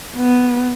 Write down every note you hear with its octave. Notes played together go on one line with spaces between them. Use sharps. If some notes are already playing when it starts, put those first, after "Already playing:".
B3